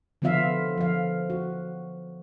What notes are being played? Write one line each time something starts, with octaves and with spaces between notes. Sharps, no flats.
D3 F3 B3 F4 E5 F5
F3 F5
F#4